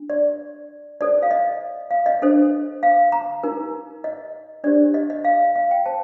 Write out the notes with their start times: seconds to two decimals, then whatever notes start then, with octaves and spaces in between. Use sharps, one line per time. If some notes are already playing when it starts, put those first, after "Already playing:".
Already playing: D4
0.10 D5
1.01 D#4 A4 C5 D5
1.23 F5
1.31 D#5
1.91 F5
2.06 D#5
2.22 D4 A4 C5
2.83 F5
3.12 A#5
3.43 D#4 A#4
4.04 D#5
4.64 D4 G4 C5 D5
4.94 D#5
5.10 D#5
5.25 F5
5.56 F5
5.71 G5
5.86 C5 A5